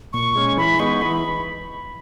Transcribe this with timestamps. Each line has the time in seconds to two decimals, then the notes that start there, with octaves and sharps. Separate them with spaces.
0.13 A#2 C#6
0.36 G#3 C#4
0.57 E3 B5
0.79 G#3 B3 D#4 C#6
1.01 E3 B5